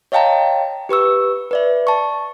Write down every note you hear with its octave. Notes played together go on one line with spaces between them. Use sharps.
C#5 D#5 F5 G5 A5 A#5
G4 B4 C#6 E6
B4 D5 E5
A5 C#6